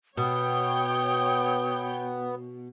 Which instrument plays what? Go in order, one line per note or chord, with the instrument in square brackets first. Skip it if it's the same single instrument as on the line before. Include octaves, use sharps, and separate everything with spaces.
[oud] B2 [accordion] B3 [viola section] C#5 G5 [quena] D#6